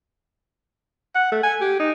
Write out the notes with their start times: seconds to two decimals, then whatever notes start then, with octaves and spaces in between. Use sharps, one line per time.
1.15 F#5
1.32 A3
1.43 G#5
1.61 G4
1.80 D#4